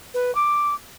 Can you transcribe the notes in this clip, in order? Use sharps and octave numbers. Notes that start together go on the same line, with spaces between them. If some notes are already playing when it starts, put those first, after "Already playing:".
B4
D6